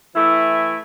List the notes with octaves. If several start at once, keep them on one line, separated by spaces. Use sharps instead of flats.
E3 A3 E4